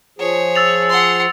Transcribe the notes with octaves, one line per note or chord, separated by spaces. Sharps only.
F3 G#4 C#5
E6 A6 F7
F#5 C6